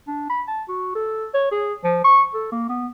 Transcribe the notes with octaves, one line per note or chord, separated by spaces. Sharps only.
D4
B5
A5
F#4
A4
C#5
G#4
F3
C#6
A4
A#3
B3